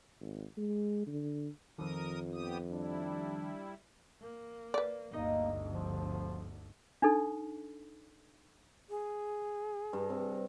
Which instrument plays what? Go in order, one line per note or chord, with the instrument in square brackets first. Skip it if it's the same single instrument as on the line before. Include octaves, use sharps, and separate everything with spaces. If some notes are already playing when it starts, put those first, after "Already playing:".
[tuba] G#1
G#3
D3
[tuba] F2 [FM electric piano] D#3 F3 [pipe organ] A#4 D#6
[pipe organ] B3 G4 D#6
[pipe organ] G3 E4 [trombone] D4
[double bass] A#3
[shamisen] B4 D5
[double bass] G1 D2 [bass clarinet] A#3 [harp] D#4 D#5
[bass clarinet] F3
[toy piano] D4 D#4 A4
[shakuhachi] G#4
[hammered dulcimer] G2
C3